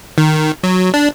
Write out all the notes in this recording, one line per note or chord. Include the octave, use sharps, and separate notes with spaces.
D#3
F#3
D4